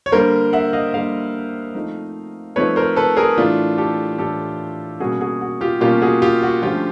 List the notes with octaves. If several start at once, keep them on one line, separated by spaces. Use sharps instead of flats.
C#5
D3 G3 A#3 A#4 C5
E5 F#5
D#5 F5
D3 G3 A#3 D#5 F5
F3 A3 C4 D#4
F3 A3 C4 D#4 B4 C#5
A#4 C5
A4 B4
G#4 A#4
A2 E3 A3 D4 F4
G4 A4
A2 E3 A3 D4 G4 A4
B2 G3 A#3 C#4 F#4 G#4
F#4 G#4
F#4
F4 G4
B2 G3 A#3 C#4 F4 G4
F#4 G#4
F4 G4
F#4
D3 F3 A3 C#4 F4 G4